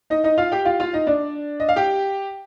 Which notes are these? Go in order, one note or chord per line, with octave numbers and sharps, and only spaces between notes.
D#4 D#5
D#4 D#5
F4 F5
G4 G5
F4 F5
F4 F5
D#4 D#5
D4 D5
D#5
F5
G4 G5